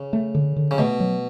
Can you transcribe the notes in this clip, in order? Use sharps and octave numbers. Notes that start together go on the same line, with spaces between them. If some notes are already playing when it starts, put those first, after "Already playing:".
Already playing: C#3
A3
D3
D3
C#3
B2 A3
F#3